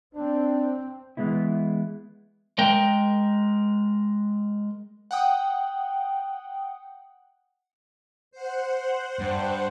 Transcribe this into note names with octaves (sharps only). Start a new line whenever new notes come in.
C4 D4
E3 G#3 B3 E4
G#3 A#4 G5
F#5 G5 D#6
C5 F#5
G2